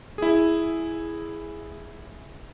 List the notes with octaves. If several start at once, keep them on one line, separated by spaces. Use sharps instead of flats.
E4 G#4